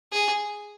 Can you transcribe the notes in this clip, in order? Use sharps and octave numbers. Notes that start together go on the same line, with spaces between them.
G#4